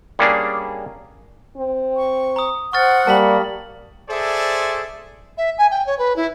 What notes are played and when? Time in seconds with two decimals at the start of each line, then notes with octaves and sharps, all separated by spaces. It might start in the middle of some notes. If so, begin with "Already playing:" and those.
0.19 G3 A#3 C#4 D4 G#4
1.58 C4
1.96 C#6
2.36 A#5 D#6
2.73 C5 F#5 C#6 F6 A6
3.07 G3 A#3 A5 B6 F#7
4.09 G#4 A4 C5 D5 E5
5.38 E5
5.58 G#5
5.71 G5
5.86 C#5
5.99 B4
6.16 E4